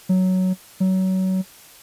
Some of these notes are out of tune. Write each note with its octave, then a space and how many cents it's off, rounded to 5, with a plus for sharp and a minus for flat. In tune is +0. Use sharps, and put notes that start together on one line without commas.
F#3 +5
F#3 +25